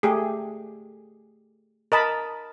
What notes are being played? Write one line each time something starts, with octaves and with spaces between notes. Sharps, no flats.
A3 G4 G#4
A#4 D#5 A5 B5